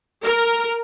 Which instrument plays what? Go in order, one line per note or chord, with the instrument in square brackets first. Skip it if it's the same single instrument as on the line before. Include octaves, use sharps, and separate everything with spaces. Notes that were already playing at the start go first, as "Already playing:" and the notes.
[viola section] A#4